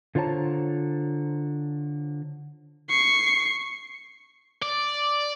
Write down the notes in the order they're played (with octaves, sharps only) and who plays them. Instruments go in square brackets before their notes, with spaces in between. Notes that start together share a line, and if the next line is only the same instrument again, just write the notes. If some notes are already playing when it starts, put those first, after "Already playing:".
[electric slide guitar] D3 F4 C5 C#5 A5 A#5
[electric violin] C#6 C7
[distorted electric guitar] D5